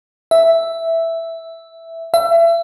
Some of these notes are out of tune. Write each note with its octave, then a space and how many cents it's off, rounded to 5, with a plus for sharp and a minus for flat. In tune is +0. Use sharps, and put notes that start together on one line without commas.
E5 +0
E5 +30